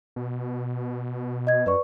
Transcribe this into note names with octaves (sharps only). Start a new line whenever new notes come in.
B2
D#5 G#6
F#2 B4 D5 C#6